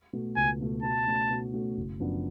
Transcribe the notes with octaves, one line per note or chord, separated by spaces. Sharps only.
B2 A3
C#2 G#5
B2 A3
B2 A5
A3 C#4 F#4
B2
A3 C#4 F#4
F#1
F#2 F3 B3 D4